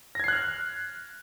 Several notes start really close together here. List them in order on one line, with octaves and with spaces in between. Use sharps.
A#6 G#6 C7 F#6 F6